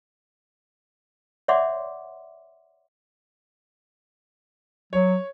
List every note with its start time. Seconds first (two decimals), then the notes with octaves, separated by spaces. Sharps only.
1.48 C#5 D5 E5 F#5 C6 D6
4.93 F#3 C#5